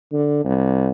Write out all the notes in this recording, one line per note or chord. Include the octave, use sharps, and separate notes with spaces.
D3
C2